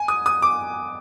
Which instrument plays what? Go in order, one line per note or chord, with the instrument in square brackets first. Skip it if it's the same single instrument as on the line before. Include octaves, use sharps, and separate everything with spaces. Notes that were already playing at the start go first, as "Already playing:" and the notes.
Already playing: [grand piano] G#5
D#6
D#6
D6